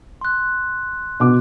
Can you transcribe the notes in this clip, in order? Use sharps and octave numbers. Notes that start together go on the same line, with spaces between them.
C6 F#6
B2 D6